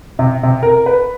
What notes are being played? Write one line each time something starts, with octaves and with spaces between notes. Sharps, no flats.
C3
C3
A#4
B4